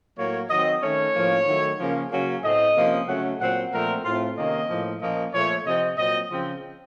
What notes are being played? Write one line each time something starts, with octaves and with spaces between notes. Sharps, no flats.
A2 F#3 A#3 C#5
D#3 F#3 C4 D#5
D#3 A3 C#4 C#5
A2 F3 A#3 C#4
D#3 F#3 A3
C#3 F3 A#3 C#4
C#3 F#3 A#3 C#4
A2 A3 C4 D#5
C3 F3 A#3 C#4
C#3 F#3 A3 C#4 F#5
A#2 F#3 C4 F#5
A#2 F3 A3 C4 A#4
A2 A3 C4 F4
C3 D#3 A#3 C#4 D#5
A2 F3 A#3
A#2 F3 A#3 C#4 D#5
A#2 F3 A3 C#5
C3 F3 C4 D#5
A#2 F#3 C4 D#5
C#3 F3 C4